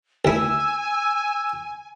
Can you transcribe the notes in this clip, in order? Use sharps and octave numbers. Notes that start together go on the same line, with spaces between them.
D2 E4 G#5 E6